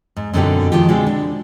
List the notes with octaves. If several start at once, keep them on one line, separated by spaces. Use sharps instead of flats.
G#2
F#2 B2 D3 C4 D#4 G4
D#3 F3 G#3 F4 G4
B2 D3 G#3 C4 F#4 G4
D4